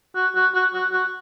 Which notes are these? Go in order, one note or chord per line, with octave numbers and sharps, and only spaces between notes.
F#4
F#4
F#4
F#4
F#4